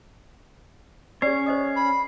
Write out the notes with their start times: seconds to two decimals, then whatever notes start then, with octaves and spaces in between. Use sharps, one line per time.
1.22 C#4 G#4 C#5 D5 C7
1.46 C5 D#5 D#6
1.76 B5